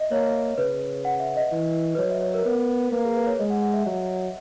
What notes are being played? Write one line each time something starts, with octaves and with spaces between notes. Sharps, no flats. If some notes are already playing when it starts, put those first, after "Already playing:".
Already playing: D#5 E5
A#3 C#5
C#3 B4
F#5
E5
D#5
E3
B4
F#3 C#5
E5
C#5
A#4
B3 A#4
A#3 B4
G#4
B4
C#5
G#3 D#5
F#5
F#5
E5
F#3